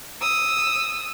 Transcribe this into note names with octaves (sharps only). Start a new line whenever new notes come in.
D#6 E6